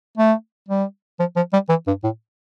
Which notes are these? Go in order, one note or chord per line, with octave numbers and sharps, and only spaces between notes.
A3
G3
F3
F3
G3
E3
G2
A2